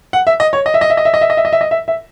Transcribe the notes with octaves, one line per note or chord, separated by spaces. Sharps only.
F#5
E5
D#5
C#5
D#5
E5
D#5
E5
D#5
E5
D#5
E5
D#5
E5
D#5
E5
D#5
E5
E5